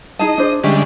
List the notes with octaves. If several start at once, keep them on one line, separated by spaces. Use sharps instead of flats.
D#4 G#4 D#5 A5
D4 G#4 C5
D3 G3 G#3 C#4 D#5 E5